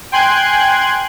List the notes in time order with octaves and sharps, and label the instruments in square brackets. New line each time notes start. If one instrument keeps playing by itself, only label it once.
[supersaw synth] G5 G#5 C6 F#6 G#6